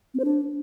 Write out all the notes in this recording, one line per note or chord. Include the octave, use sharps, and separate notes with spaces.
C4
C5
D4